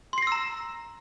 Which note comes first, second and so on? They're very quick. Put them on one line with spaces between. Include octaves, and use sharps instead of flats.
C6 C7 A#6 E6 A#5